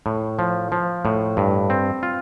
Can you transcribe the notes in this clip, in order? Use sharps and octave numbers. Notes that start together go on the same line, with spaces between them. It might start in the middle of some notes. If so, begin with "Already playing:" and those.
A2
F3
F3
A2
G2
C4
F4